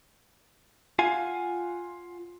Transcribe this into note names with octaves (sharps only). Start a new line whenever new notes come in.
F4 F5 F#5 G#5